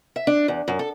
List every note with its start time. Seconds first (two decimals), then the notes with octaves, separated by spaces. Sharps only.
0.16 E5
0.27 D4
0.48 E2
0.68 F#2
0.79 A4